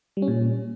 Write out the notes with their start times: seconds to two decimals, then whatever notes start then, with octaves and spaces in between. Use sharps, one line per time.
0.17 G3
0.22 C#4
0.28 A#2